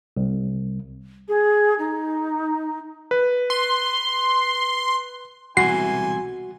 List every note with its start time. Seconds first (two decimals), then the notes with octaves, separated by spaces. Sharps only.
0.17 C2
1.28 G#4
1.79 D#4
3.11 B4
3.50 C6
5.57 E1 C2 A2 E3 F#4 G#5 C6 C7